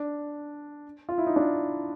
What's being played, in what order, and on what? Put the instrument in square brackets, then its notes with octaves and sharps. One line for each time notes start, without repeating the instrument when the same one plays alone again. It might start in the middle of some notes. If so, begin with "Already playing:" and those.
Already playing: [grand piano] D4
F4
E4
D#4
D4